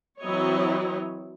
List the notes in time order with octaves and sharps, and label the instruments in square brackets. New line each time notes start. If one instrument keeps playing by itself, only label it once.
[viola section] E3 F#3 C4 E4 C#5 D#5